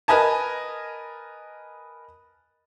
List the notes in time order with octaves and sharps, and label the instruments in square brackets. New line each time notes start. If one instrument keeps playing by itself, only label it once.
[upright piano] A#4 B4 D#5 G#5 A5